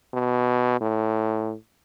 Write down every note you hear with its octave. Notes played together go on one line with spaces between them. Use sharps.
B2
A2